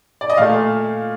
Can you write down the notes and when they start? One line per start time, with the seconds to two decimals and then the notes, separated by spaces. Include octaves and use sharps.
0.21 D5
0.30 D#5
0.37 A#2 A3 F5